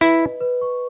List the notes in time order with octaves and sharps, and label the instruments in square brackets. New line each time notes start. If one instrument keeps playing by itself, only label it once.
[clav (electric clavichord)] E4 [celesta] B4
[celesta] D#5
B4
C#6